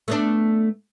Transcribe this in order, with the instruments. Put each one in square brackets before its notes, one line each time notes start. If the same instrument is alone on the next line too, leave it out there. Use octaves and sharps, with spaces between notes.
[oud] A3 B3 D4